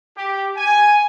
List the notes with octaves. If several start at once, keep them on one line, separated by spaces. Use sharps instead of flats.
G4
G#5